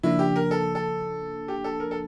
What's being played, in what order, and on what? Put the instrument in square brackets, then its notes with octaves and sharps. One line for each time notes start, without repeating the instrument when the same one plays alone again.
[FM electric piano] C#3 F3 A#3 D4 [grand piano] E4
[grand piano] G4
A#4
A4
A4
G4
A4
A#4
A4